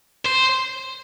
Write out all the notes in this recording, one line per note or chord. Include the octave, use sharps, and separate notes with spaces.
C5